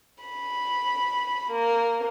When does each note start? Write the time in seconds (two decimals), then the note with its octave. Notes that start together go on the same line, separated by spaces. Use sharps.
0.22 B5
1.52 A#3